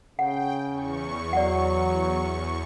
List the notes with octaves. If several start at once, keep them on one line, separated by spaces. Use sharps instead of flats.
C#3 F#5 G5
E2 C#6
F#3 D5 F#5